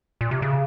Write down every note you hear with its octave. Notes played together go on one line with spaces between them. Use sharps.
A#2
C3
C#3